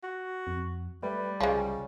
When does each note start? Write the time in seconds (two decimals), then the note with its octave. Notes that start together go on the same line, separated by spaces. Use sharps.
0.04 F#4
0.47 F2
1.03 G3 A3 B4
1.41 C2 C#3 F3 G#3